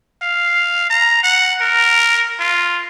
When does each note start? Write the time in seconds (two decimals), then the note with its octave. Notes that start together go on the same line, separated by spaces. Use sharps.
0.22 F5
0.90 A#5
1.23 F#5
1.61 A#4
2.40 F4